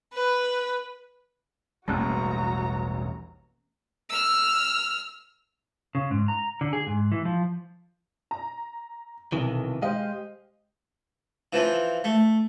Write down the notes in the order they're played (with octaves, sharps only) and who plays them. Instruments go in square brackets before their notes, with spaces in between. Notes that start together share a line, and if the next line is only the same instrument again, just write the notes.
[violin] B4
[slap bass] E1 A1 G3 [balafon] A#3 C#4 [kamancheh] F#4 A#5
[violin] E6 F6
[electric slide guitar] C#3
G#2
A#5
D3
G#4
G#2
E3
F3
[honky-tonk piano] A#5
[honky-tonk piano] B1 [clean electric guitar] C3 D#3 E3
[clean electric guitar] G#3 G4 D#5 [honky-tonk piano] C5 F5
[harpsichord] E3 F3 C4
A3